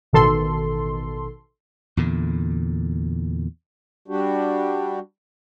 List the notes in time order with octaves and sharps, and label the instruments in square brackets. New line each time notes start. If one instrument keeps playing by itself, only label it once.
[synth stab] A1 B2 D#3 A4 C6
[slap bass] E2 A#2 D3
[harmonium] G3 D4 F#4 G4